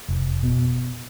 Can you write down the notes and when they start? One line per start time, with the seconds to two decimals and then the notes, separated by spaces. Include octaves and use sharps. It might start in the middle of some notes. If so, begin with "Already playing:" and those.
0.08 F1
0.43 B2